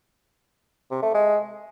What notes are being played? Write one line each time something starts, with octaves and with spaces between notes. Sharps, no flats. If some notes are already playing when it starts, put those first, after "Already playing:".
C3
A3
G#3